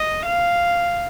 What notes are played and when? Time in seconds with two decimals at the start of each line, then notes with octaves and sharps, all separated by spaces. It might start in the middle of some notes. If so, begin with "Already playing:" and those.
Already playing: D#5
0.26 F5